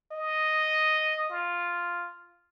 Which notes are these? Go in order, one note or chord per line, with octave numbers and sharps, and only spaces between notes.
D#5
F4